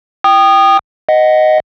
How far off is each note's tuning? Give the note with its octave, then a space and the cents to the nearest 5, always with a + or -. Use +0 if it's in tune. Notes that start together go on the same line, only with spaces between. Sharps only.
G5 +0 D#6 -20
D#5 +0 F#5 +15